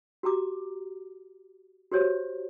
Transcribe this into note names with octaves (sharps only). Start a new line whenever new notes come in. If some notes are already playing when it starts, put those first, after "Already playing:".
F#4 G4 A#5 D6
F#4 G4 C5 C#5